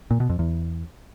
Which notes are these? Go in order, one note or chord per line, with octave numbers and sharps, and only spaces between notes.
A#2
B2
F2
E2